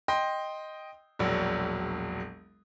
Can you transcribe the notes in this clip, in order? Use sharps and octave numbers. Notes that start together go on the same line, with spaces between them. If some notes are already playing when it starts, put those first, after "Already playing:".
D#5 G5 C6
E1 A#1 F#3